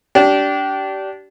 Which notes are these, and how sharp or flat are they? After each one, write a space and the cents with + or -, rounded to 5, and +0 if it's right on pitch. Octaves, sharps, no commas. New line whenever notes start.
D4 -20 G4 -25